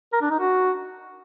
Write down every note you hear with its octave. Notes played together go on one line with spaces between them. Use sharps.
A#4
D4
D#4
F#4